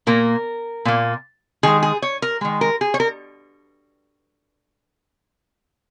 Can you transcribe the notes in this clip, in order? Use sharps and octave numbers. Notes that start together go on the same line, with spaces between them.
A#2 A#3 A#4
A#2 A#3
D#3 G#3 G#4
G#4
C#5
A#4
D#3 G#3
A#4
G#4
C#5
A#4